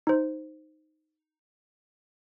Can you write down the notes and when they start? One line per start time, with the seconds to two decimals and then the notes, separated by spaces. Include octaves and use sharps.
0.07 D#4 C5